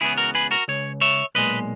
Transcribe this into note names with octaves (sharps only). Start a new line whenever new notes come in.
C#2 C#3 E3 B3 E4 G#4
F#4 A#4
G#4 B4
F#4 A#4
C#2 C#3 C#5
C#5 E5
B1 A#2 G#3 B4 D#5